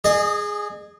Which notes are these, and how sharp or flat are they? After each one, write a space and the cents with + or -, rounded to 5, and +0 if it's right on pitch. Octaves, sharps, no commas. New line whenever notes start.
G#4 +0 D#5 -35